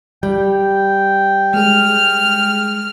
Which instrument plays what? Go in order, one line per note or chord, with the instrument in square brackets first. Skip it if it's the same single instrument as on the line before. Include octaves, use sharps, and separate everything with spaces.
[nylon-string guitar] G3 [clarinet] G5 [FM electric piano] G6
[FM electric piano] G#3 G#4 [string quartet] F6